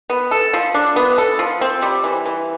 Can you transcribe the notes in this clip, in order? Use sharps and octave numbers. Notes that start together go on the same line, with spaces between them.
B3
A4
F3
D4
B3
A4
F3
C4
G3
E3
E3